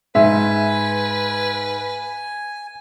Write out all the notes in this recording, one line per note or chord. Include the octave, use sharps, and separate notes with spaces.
G#2 B4 E5 G#5